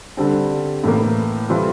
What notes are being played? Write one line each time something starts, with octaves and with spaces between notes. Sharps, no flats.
D3 G3 C4
A2 E3 A#3
E3 G3 C4 F4 A4